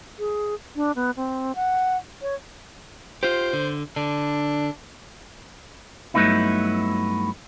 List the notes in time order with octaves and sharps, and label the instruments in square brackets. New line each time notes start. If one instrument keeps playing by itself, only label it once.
[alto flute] G#4
D4
B3
C4
F#5
C#5
[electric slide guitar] F4 G4 [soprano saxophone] C5
[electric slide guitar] D3
[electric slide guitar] D3 [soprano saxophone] D4
[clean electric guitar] G2 F#3 A3 B3 D#4 E4